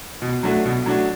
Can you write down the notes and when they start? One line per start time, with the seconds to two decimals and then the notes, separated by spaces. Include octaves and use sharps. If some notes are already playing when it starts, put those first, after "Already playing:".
0.22 B2
0.43 F#3 A3 D4 F#4
0.65 B2
0.86 F#3 A3 D4 F#4